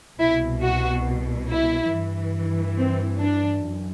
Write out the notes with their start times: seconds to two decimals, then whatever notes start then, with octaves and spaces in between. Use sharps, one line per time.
0.19 C2 B2 E4
0.62 F#4
1.49 E4
1.91 G2 E3
2.77 C4
3.21 D4
3.63 F#2